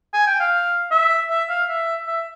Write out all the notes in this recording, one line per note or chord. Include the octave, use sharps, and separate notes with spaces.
G#5
G5
F5
E5
E5
F5
E5
E5